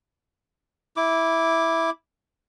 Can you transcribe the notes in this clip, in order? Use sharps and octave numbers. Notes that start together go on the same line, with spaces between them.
E4 D6